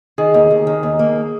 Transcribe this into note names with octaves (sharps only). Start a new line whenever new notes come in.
D#3 G#4
D#2
D#2
D#3
D#2
A#3